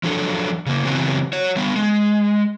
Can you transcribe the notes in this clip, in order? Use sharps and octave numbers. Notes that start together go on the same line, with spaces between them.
F3 F#3 D4 A4
C#3 A#3
C#3 E3 F#3 B3 C4
F#4 C#5
G3 B3
G#3